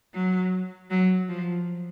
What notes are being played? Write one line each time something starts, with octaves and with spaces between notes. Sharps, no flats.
F#3
F#3
F3